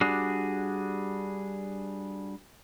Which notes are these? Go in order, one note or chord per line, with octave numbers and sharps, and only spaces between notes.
G3 D4 F#4 G#4